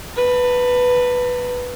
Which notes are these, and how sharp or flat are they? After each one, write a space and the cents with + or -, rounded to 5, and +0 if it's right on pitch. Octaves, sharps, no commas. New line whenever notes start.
B4 +0 A5 +45